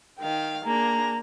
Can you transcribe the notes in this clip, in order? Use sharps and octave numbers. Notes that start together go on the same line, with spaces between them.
D#3 F5 G5
A#3 D4 G#4 A#5